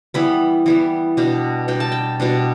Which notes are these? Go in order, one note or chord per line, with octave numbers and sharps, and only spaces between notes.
E3 G3 B3 B5
E3 G3 B3
B2 G3 D4
B2 G3 D4 G5
A5
G5
B2 G3 D4